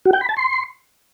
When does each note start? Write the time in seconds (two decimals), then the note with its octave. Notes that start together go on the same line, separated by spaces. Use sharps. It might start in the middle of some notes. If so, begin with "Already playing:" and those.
0.05 F#4
0.13 G5
0.21 B5
0.29 A5
0.37 C6